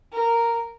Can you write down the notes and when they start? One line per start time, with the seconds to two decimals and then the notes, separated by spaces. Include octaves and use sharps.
0.13 A#4